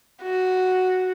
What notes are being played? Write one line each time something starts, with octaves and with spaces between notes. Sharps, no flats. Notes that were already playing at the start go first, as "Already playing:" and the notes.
F#4